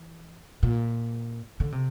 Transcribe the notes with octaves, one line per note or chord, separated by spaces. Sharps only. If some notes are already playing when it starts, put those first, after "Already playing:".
Already playing: E3
A#2
D3
C3